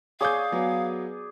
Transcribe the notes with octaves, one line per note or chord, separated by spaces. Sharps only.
G#4 C#5 D5 F5 G6
F#3 B3